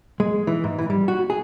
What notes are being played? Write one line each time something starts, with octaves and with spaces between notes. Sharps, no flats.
G#3
E3
G#2
E3
G3
F#4
G#4